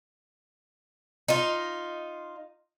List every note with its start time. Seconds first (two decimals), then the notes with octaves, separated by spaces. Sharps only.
1.28 D#4 F4